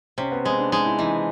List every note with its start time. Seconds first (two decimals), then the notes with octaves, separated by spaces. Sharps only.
0.18 C3 C#4
0.32 B3
0.44 G#3 C4
0.59 D4
0.72 G#3 D#4
0.85 E4
0.99 E3 D#4